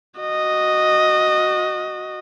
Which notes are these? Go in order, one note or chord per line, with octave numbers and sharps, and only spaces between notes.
F#4 D#5